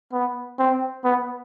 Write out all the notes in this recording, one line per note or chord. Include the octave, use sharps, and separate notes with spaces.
B3
C4
B3